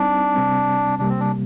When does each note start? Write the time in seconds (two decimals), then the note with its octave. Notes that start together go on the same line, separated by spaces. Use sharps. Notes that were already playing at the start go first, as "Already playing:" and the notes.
Already playing: G3 C4 D4 D#4
0.36 C3 G3 C4
0.99 C3 G3 A#3 D4
1.09 C4
1.20 D4